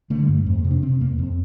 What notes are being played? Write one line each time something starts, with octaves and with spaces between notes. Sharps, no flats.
D3 A3
G3
G2
A3
F2
A#3
C3
D4
C3 C4
F2 A#3
F2 C4